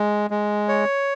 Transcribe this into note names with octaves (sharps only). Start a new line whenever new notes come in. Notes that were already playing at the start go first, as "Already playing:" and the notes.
Already playing: G#3
G#3
C#5